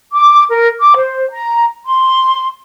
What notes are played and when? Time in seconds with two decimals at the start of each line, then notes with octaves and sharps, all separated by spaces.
0.12 D6
0.50 A#4
0.79 D6
0.96 C5
1.31 A#5
1.86 C6